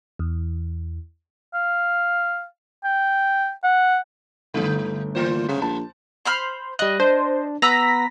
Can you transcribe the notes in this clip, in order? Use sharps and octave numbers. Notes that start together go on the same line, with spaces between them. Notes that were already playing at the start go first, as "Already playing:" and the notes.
E2
F5
G5
F#5
G1 D3 A3
A#2 D#3 C5
C#3 G3
A#1 A5
C5 B5 F6
G3 D#5 F#6
D4 C5
B3 B4 A#5 E6 A#6 B6